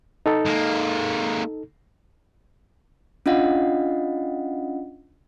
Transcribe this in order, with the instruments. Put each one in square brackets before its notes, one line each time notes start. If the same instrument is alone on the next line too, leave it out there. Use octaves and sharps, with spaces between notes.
[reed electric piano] D#4 A4
[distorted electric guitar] G#3 A#3
[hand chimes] C#4 D4 F4 D#5 F5 F#5